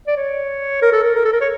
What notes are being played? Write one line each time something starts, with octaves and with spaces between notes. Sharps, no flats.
D5
C#5
A#4
A4
A#4
A#4
A4
A#4
C#5